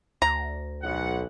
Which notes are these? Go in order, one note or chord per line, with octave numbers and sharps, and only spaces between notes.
D2 A#5
B1 F#5